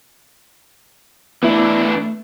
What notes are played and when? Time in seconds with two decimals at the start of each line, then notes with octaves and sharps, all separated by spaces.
1.43 E3 A3 B3 D4 E4